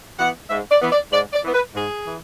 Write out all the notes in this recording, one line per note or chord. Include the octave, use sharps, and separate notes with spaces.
E3 B3 F#5
G#2 E5
D5
E3 B3
D5
G#2 D5
D5
E3 B3
B4
G#2 G#4
E3